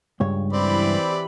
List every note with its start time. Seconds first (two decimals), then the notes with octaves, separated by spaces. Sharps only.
0.20 C#2 G2 C#5
0.53 E3 C4 G4 D5 B5